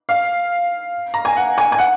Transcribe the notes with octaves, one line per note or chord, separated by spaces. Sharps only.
F5
A#5
G#5
F#5
G#5
G#5
F#5